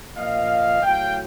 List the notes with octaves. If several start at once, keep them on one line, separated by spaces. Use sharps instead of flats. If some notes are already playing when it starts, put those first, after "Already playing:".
A#2 F3 D#5 F5
A2 F#3 F5 G5